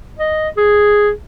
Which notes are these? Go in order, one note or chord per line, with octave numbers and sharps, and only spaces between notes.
D#5
G#4